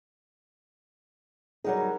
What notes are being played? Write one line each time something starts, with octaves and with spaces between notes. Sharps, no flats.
F#3 G3 D#4 G#4 A#4 F#5